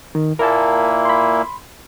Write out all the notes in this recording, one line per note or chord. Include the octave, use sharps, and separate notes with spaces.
D#3
A#2 A#3 E4 A#4 G#5 A5
B5 C6